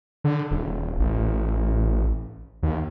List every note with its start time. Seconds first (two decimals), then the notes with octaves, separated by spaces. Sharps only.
0.24 D3
0.51 D#1
0.99 A1
2.63 D#2